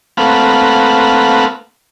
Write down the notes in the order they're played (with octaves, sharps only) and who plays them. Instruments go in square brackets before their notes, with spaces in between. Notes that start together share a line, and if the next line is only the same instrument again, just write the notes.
[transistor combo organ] A3 A#3 C4 B4 F5 F#5